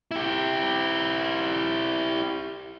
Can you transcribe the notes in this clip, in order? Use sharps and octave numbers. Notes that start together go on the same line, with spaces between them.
E4 G4